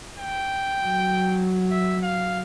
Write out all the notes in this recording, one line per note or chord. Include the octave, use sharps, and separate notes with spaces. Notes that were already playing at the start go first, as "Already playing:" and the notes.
G5
F#3
E5
F5